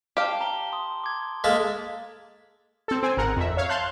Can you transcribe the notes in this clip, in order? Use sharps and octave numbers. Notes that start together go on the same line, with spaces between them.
G4 F5 A5 D7
A#5 G7
C6 D#6
D6 G#6
G#3 A#3 A4 B6
C4 A4
C4 G#5
G#1 A#4 F#5
F2 E5
C#5 F5
F5 A5 C6 F#6 G6